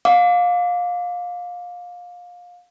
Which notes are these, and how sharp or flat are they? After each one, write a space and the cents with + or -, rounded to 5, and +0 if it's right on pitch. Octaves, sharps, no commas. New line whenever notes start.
F5 +25 D6 -15